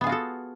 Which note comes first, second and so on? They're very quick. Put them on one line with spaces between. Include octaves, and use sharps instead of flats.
B3 G#4 F4 F#4 A4